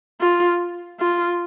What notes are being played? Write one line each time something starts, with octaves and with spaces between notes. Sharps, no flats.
F4
F4